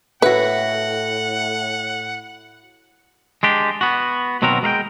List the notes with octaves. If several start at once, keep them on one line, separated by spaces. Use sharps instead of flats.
A2 E4 F#4 B4 F#5
G#3 D4 G4
B3 F#4
D#2 B2 F#3 C4 F#4 A#4
G#3 A#4 F5 G5